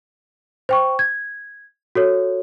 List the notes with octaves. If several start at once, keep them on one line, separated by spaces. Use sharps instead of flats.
C5 G5 C#6
G#6
F#4 A4 C#5